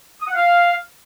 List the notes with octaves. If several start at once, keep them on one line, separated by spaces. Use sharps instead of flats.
D#6
F#5
F5